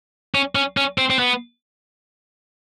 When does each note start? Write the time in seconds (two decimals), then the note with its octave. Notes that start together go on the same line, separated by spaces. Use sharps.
0.35 C#4
0.55 C#4
0.77 C#4
0.98 C4
1.10 C4
1.19 B3